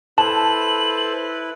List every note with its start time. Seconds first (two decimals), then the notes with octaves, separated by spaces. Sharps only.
0.18 E4 A4 B4 C5 A5 F#7